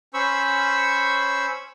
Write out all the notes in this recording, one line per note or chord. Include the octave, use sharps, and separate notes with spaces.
C#4 C5 B5 C#6 E6